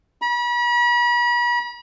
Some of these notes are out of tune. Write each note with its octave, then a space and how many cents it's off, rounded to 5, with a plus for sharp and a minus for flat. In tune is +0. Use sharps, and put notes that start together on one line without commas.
B5 -40